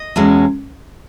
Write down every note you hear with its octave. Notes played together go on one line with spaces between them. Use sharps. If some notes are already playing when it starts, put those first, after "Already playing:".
Already playing: D#5
E2 B2 G#3 C#4